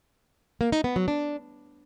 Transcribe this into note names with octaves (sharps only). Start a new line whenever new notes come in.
A#3
D#4
B3
F#3
D4